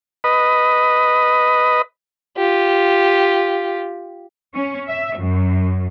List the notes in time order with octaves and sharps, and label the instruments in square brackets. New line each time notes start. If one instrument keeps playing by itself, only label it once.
[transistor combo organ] B4 D#5
[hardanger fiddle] F4 G4
[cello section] C#4
E5
F#2